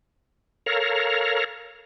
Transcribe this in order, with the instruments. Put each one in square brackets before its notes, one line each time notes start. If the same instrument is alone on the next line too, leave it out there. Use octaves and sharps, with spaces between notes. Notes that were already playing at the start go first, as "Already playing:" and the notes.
[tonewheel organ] A4 A#4 C#5 F5 A#5